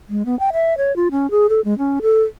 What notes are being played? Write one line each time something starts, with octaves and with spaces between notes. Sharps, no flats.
G#3
B3
G5
E5
C#5
F4
C#4
G#4
A4
G#3
C#4
A4